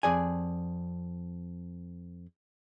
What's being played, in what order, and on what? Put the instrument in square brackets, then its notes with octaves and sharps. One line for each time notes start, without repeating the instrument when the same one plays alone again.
[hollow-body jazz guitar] F2 G#4 D5 G#5